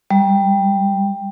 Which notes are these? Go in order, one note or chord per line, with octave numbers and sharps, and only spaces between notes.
G3